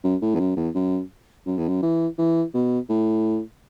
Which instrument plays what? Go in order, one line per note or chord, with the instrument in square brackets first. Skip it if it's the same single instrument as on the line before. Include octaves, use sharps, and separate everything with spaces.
[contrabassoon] F#2
A2
E2
F#2
E2
F#2
F#2
E2
F#2
E3
E3
B2
A2